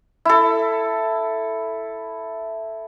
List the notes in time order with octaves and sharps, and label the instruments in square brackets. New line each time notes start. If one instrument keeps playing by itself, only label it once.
[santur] E4 A4